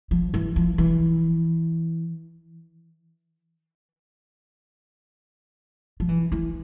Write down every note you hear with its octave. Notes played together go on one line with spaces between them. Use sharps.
F3
E3
F3
E3
F3
E3
E3